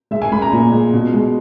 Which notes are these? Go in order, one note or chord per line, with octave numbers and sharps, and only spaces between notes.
G#3 E5
G#5
G#3 B5
A#5
A#2
G#3
B2
G#3